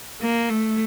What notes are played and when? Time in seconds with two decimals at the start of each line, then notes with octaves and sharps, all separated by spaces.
0.21 A#3
0.50 A3